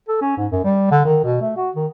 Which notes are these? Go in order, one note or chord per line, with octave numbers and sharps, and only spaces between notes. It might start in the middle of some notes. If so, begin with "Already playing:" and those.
A4
C#4
G#2
F#2
G3
D3
D#3
B2
A3
F#4
D#3